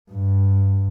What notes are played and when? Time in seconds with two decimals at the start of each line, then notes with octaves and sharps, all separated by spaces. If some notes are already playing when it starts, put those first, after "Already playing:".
0.12 G2